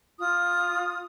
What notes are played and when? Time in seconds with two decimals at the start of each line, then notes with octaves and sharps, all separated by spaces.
0.19 F4 D#6